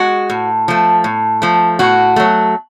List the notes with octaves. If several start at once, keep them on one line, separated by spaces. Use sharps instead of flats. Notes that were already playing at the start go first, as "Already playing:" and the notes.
Already playing: G#3 F#4
A2
F3 A3
A2
F3 A3
A2 F#4
F#3 A3